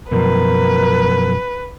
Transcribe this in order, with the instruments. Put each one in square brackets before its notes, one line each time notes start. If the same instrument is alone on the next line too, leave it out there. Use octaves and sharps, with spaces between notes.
[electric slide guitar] F#2 B2 F3 [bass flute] A#4 [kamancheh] B4